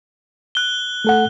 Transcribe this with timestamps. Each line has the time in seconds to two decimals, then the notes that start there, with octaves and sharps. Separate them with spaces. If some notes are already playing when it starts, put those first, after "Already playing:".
0.55 F#6 G7
1.05 A3 A4 F#5